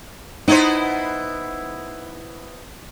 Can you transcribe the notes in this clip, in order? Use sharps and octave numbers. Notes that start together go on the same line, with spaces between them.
B3 D#4 E4 C5